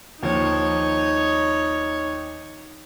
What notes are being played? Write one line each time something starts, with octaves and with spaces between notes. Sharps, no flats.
D#2 F3 D#4 C#5